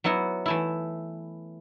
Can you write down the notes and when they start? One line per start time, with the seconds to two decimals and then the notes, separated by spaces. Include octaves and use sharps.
0.04 F#3 B3 E4 F#4
0.46 E3 A3 E4